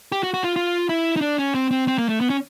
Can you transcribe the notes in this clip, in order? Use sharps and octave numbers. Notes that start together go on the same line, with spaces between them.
G4
F#4
F#4
F4
F4
E4
D#4
D4
C#4
C4
C4
C4
A#3
A3
B3
C#4